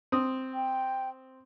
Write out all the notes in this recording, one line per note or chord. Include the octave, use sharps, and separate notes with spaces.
C4 D#6
G5